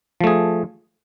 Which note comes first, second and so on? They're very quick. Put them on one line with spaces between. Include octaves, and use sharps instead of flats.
F3 A3 G#4